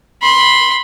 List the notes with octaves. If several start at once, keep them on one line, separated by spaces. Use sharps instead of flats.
B5 C6